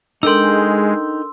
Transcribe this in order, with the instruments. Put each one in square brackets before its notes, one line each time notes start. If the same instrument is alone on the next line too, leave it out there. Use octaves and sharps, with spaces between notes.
[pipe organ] G#3 [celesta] D4 A4 A#4 [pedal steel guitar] D#4 G5 [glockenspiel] C6 E6